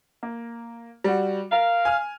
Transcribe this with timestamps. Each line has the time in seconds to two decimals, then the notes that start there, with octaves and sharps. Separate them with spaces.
0.23 A#3
1.04 G3 F#4
1.52 A#4 F5
1.85 G#5 F6